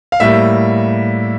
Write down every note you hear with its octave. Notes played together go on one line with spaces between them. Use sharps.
F5
A2 G3 A#3 E5